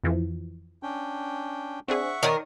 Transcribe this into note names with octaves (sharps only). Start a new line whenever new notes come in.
F2 E3 F3
C#4 D4 G5
C4 D4 G#4 E5 F#5 C#6
D#3 A#4 C#5 D5 D#6